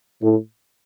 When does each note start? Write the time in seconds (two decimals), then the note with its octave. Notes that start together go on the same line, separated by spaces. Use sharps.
0.22 A2